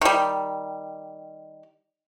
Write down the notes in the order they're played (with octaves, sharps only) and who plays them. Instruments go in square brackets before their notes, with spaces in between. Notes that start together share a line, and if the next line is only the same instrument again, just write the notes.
[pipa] D#3 G3